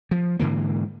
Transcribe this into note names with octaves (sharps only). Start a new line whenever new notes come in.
F3
G#2 D3 E3 A#3